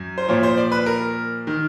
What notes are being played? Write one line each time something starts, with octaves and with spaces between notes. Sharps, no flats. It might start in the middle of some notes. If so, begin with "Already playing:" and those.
Already playing: F#2
C5
A#2 F3 C#5
C5
D5
B4
A#4
D#3